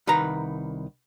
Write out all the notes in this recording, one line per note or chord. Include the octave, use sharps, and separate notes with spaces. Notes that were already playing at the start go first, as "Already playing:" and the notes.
C2 D#3 B4 A#5